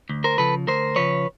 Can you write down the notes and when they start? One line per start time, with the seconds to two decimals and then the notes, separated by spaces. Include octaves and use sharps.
0.09 D2
0.24 A#4 C5
0.38 C#3 F3 A4 B4
0.67 D2 A#4 C5
0.96 C#3 F3 B4 C#5